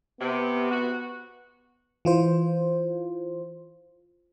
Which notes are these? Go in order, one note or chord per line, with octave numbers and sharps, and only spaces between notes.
C3 B3
F#4
E3 F4 C5